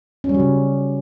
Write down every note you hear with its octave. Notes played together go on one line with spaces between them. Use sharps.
C#4
G3
F#3
C#3